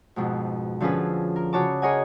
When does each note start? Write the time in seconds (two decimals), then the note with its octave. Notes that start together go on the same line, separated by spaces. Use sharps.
0.16 F2 G#2 B2
0.81 D3 F3 C#4 F4 G#4 B4
1.36 A#4
1.53 C#3 F#4 C#5 A5 D6
1.82 G#4 A#4 C#5 D#5 F#5 G#5